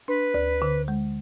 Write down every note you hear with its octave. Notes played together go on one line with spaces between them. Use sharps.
D4 B4
D2
D3
G#3